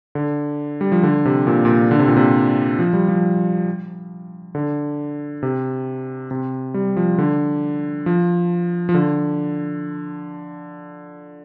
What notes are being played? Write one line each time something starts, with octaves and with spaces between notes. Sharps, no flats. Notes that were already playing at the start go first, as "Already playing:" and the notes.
D3
G3
F3
D3
C3
A#2
A#2
D3
C3
A#2
C3
F3
G3
F3
D3
C3
C3
G3
F3
D3
F3
F3
D3